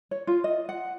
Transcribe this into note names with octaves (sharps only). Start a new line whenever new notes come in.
C#5
F4
D#5
F#5